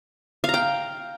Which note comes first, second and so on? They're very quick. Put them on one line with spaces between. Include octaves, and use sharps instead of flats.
F5 A#5 G5